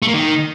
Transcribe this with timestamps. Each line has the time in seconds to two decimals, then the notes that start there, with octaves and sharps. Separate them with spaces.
0.02 A3
0.08 A#3
0.13 D#3